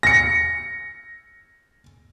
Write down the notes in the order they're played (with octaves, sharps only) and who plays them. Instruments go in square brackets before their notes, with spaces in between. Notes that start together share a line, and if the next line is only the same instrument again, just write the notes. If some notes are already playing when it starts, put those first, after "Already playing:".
[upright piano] A#6 C#7